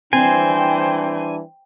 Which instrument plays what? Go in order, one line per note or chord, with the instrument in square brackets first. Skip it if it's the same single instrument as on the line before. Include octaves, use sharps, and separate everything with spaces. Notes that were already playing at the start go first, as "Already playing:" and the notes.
[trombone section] E3 G3 D4 [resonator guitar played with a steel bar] C4 [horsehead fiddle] C5 G5 [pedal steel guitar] G#5